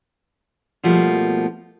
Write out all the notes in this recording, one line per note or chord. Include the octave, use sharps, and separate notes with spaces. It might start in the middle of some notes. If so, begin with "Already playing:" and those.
B2 F3 G3 A3 A#3